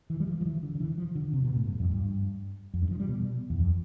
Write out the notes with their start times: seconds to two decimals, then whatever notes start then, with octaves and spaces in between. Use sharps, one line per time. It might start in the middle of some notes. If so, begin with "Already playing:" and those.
0.10 E3
0.20 G3
0.27 F3
0.41 F3
0.45 E3
0.63 D3
0.75 D3
0.80 E3
0.98 F3
1.15 D3
1.33 C3
1.45 B2
1.57 A2
1.68 G2
1.80 F2
1.91 G2
2.74 F2
2.82 G2
2.91 F3
3.00 G3
3.09 B2
3.50 E2
3.59 F2